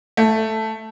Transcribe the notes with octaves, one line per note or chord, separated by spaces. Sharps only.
A3